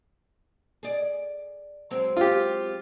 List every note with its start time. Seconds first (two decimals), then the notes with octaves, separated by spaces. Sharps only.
0.83 G#4 D5
1.91 F#3 G#3 C4
2.17 F4 G4